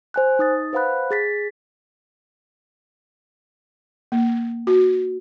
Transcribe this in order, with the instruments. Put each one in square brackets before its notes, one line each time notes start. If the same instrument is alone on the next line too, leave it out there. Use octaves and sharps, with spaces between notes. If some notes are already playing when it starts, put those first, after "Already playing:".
[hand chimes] C5 G#5 F#6
D#4 D#6 A6
B4 C5 F5 F#5 B5 F#6
G#4 A6 B6
[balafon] A#3
F#4